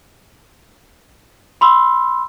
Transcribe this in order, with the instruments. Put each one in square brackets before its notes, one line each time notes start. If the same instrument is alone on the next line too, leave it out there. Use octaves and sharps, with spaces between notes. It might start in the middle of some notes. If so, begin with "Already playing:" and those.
[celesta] B5 C6 E6